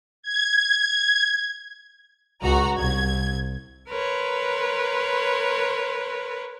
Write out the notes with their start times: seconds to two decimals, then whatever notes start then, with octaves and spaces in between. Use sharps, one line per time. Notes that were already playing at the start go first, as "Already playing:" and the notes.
0.23 G#6
2.42 C#2 F#4 A#5
2.77 C2 G#6
3.87 A#4 B4 C#5 C6